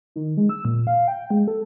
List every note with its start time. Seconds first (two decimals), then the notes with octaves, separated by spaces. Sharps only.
0.16 D#3
0.37 G#3
0.49 E6
0.65 A#2
0.87 F5
1.08 G5
1.31 G#3
1.47 A4